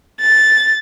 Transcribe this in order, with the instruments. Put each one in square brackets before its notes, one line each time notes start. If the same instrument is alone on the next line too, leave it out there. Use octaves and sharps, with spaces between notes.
[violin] A6